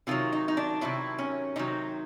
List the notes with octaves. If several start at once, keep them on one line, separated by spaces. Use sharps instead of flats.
C3 D#3 F#3 F4
D#4
D#4
D4
C3 D#3 F#3 E4
C#4
C3 D#3 F#3 D#4